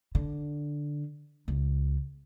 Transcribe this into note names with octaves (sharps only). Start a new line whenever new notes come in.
D3
C#2